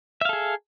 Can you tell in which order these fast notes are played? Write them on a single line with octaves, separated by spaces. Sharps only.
E5 F5 A4 G#4